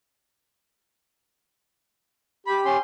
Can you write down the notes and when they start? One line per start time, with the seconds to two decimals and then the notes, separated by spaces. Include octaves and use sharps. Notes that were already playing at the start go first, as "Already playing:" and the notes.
2.47 G4 B5
2.65 C#4 C6